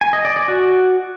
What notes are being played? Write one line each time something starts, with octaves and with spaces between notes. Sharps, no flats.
G#5
D#5
D5
D5
F#4